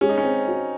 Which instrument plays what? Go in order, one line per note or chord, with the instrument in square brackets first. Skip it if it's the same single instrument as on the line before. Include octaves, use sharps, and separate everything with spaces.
[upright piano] G#3 [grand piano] C#4
[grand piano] D#4
C#4
[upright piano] C4
F#4